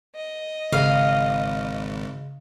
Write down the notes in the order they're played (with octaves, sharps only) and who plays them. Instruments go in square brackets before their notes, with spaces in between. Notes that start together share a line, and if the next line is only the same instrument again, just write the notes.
[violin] D#5
[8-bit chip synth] G#1 [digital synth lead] C#3 [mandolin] F5